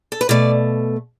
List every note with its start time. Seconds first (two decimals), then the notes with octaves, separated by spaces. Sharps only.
0.12 A4
0.21 B4
0.29 B2 A3 D5